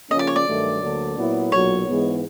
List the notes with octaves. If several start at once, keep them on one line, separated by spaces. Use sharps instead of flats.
C#3 F3 A#3 C#4 D#5
D5
C#5
D5
G2 D#3 F#3 A3
D2 D3 F#3 A#3 D4
A#2 F#3 B3 E4
B1 A#2 F#3 C#5
G#2 E3 G#3 B3